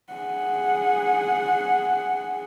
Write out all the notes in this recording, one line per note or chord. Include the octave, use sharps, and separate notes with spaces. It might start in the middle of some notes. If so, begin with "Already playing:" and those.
G#4 F#5